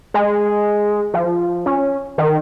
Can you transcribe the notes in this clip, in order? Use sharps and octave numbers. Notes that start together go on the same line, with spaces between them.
G#3
F3
C#4
D#3